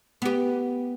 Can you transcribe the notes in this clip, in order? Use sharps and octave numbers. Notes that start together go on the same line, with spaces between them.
B3 G4